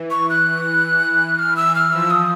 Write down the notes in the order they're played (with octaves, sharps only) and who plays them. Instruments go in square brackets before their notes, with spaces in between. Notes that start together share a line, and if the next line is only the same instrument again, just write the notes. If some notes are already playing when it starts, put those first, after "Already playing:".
Already playing: [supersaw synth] E3
[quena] C#6
F#6
F6
E6
F6
[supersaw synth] F3 [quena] E6
[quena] D#6